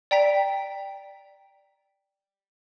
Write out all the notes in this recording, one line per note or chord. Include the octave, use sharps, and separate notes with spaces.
D5 G5 A#5 B6